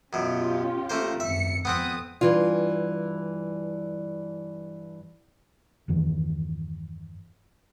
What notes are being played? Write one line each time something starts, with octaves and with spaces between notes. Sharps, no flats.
F#2 B2 C#4 F4 G4
A3 A#3 C5
G#1 F#2 E5 C#7
F2 B3 C4 B4 D#6
G2 E3 F4
E2 G2 D#3 E3